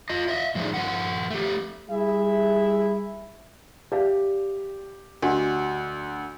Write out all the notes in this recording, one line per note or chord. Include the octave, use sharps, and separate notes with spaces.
F4 D#5
D#5 E5
A2 F3 A3 D4 D#4 G#4
F3 A#4 F#5
A3 G4
G3 E4 G#4 E5
G4 D5 E5 F5
D2 D4 F#4 D#5